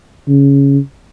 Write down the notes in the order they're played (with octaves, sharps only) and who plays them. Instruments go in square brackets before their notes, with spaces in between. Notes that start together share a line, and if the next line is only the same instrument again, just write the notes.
[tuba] C#3